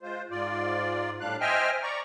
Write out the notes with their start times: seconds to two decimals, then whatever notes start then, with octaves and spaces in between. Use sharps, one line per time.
0.02 G#3 F4 C5
0.31 G#2 F4 D5
1.20 A2 G3 D4 F5 F#6
1.41 C5 D#5 E5 G5 G#5 F6
1.83 D5 A#5 C#6